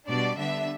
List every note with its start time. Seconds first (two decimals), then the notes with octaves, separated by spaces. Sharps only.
0.08 B2 G3 D4 D5
0.38 D3 G3 B3 D4 E5